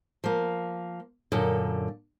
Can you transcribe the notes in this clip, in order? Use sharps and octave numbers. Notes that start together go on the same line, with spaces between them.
F3 A#3
F#2 A#2 D3